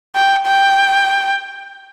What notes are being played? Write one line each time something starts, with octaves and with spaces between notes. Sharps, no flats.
G5
G5